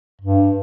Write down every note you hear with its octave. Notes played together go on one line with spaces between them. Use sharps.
G2